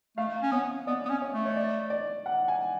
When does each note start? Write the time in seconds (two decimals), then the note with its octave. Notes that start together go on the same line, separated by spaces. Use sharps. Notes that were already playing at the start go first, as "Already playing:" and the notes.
0.17 A3 F5
0.43 C#4
0.52 B3 C#5
0.87 B3 D5
1.05 B3
1.10 C#4
1.22 C#5
1.33 A3
1.45 C#5
1.56 D5
1.90 D5
2.26 F#5
2.48 G#5